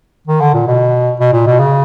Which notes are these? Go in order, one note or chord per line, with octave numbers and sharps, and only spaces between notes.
D#3
D3
A#2
B2
B2
A#2
B2
C#3